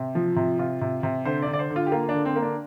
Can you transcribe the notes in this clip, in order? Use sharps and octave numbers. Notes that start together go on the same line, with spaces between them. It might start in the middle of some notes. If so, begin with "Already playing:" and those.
Already playing: C3
F3
C3
C3 F4
C3
C3
D3 C5
D5
D3
D5
C5
D3
F4
G4
A#3 F4
D3 D4
C4
A#3
D4